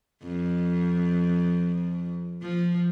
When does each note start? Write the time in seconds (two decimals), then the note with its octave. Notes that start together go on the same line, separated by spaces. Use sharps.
0.23 F2
2.42 F3